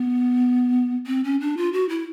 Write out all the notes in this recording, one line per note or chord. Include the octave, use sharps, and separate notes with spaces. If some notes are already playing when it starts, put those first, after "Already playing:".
Already playing: B3
C4
C#4
D4
F4
F#4
E4